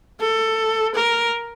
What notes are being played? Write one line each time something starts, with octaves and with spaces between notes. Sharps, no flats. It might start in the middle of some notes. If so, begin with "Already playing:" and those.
A4
A#4